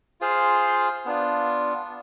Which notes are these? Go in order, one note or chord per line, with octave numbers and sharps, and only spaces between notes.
F4 G#4 C5 F5
B3 D4 F4